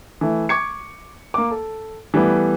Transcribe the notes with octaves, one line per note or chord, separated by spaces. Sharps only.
E3 A3
C#6 D6 G#6 C#7
A#3 D6
A4
E3 G3 A3 B3